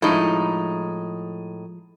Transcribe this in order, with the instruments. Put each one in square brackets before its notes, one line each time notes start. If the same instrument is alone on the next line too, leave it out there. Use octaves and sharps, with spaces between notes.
[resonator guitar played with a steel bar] A2 D#4 [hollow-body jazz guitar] F3 G#3 E4